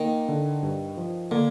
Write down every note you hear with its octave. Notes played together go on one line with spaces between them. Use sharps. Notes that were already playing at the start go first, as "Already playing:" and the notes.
Already playing: D#3 A#3
D3
G2
F3
D3 A#3